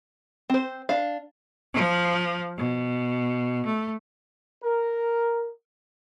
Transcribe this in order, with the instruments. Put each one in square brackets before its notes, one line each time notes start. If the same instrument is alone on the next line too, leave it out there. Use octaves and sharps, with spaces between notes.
[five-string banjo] C4 C5
D4 F5
[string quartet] F3
B2
A3
[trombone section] A#4